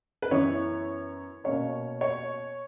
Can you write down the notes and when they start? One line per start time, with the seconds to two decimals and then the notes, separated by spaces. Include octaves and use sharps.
0.22 B4
0.31 F#2 E3 B3 E4 C#5
1.44 B2 A#3 C#4 C#5
2.01 C#5